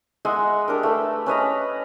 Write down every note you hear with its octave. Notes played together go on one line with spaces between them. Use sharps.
G#3 D#5 E5 F#5
D4 G4 A#4
A3 B4
C#4 B4 D#5 A#5